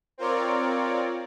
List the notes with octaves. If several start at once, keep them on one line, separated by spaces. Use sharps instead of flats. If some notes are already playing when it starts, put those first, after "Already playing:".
C4 F4 A#4 C#5 D5